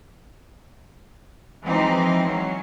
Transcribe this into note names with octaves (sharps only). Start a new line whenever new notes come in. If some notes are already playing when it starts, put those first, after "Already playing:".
E3 F3 G#3 C4 D#4
F#3 C#4